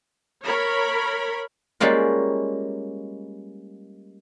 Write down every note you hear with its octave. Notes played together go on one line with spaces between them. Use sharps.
A#4 C#5 B5
G3 G#3 A#3 C#4 F4